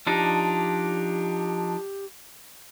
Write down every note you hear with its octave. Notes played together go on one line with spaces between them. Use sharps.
F3 D4 D#4 G4